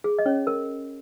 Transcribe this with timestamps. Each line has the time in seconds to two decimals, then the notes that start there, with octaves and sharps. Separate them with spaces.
0.04 G#4
0.19 D#5
0.26 C#4 C#5
0.47 A#4